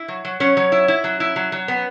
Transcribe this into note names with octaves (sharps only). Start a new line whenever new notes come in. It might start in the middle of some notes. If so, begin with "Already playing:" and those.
Already playing: E4
F#3
F#3
F#3 C#4 C#5
F#3
E4
E4
F#3
E4
F#3
F#3
B3